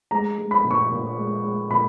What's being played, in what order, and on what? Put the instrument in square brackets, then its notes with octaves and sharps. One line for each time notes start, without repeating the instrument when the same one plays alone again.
[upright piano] G#3 A#5
G#3
B5
A#2
C#6
A#2
G#3
G#3
A#2 B5